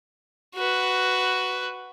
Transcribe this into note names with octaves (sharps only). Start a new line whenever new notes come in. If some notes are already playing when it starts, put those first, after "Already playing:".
F#4 B4